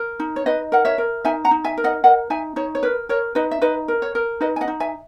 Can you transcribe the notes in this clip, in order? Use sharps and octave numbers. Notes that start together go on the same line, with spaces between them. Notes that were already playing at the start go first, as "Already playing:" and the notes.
Already playing: A#4
D#4
C#5
D#4 B4 D#5
A#4 F#5
C#5 E5
A#4
D#4 E5 G#5
F#5 A#5
D#4
E5 G#5
A#4
D#5 F#5
A#4 D#5 F#5
D#4 E5 G#5
D#4 C#5
C#5
A#4 B4
A#4 C#5
D#4 B4 D#5
E5
D#4 B4 D#5
A#4
C#5
A#4
D#4 B4 D#5
G#5
D#5 F#5
D#4
E5 G#5